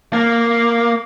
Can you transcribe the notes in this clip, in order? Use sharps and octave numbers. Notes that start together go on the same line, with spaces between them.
A#3